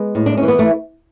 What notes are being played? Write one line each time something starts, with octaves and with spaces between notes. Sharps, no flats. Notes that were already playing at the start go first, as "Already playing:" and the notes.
Already playing: G#3 B3
A2
D4
C#4
E3
B3
A3